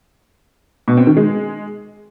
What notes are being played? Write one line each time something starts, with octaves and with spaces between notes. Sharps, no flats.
B2
C4
D#3
G#3